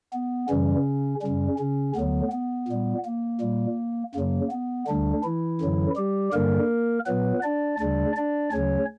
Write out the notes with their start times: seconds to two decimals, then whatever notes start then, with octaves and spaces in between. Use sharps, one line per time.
0.13 B3
0.49 F#2 C#3 E3 G3 C#4
1.22 F#2 C#3 G3 C#4
1.59 C#3 C#4
1.95 D2 D3 F#3 B3
2.32 B3
2.68 A#2 G3
3.05 A#3
3.41 A#2 G3
4.15 F#2 C#3 F#3 A#3
4.51 B3
4.87 D2 D3 G3 D4
5.24 E3 E4
5.61 F#2 D3 F#3
5.96 G3 G4
6.33 G2 D3 G3 A#3 A#4
7.07 A#2 F#3 B3 B4
7.43 D4 D5
7.79 D2 C#3 G3 D4 D5
8.16 D4 D5
8.52 D2 C#3 F#3 C#4 C#5